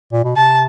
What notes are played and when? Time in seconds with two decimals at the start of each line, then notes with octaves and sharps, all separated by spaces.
0.13 A#2
0.24 B2
0.36 C3 A5